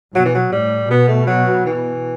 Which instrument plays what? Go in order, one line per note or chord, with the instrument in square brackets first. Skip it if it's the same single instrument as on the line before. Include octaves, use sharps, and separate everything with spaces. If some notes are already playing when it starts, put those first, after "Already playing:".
[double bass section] B2 [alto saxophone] F#3
[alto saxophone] E3
F#3
[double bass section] A2 [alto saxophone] G3
[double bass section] B2 [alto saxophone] B3
[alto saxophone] A3
F#3
E3